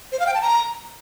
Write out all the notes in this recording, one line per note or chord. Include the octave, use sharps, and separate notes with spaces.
C5
F5
G5
A5
A#5